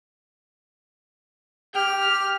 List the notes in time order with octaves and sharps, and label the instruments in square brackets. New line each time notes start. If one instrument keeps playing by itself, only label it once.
[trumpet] G4 [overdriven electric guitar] G5 [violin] F6